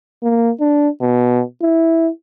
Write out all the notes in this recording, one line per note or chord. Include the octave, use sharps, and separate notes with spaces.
A#3
D4
B2
E4